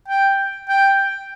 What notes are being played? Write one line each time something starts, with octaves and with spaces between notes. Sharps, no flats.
G5
G5